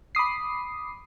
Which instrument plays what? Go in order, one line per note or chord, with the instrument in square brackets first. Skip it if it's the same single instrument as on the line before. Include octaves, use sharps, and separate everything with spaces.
[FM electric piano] B5 D6 D#6 C7